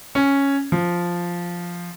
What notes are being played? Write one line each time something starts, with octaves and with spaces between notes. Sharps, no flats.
C#4
F3